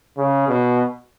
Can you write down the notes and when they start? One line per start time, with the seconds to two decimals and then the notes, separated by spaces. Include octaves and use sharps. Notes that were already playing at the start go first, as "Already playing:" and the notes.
0.18 C#3
0.48 B2